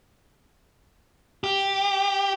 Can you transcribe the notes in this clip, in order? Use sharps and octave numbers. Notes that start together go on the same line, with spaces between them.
G4